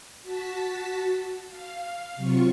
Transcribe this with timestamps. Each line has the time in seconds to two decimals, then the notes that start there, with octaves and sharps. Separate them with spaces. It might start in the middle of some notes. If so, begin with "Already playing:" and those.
0.23 F#4 A5 B6
1.48 F5
2.16 C3 F#3 F4 C#6